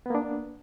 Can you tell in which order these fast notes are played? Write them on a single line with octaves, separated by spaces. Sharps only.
B3 A#3 D4